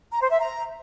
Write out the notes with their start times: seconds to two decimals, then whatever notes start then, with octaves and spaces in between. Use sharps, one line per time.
0.11 A#5
0.21 C5
0.31 E5
0.40 A#5